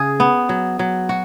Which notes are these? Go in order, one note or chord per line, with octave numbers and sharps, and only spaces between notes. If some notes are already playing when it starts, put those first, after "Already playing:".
Already playing: C#3 G#4
B3
F#3
F#3
F#4